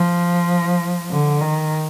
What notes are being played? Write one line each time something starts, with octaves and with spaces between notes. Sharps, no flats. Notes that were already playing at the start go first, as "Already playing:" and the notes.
Already playing: F3
D3
D#3